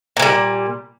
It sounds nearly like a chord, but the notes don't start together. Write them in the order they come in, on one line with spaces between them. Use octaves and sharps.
A#2 E3 G3